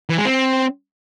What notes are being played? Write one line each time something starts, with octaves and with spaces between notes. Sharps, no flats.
E3
G#3
C4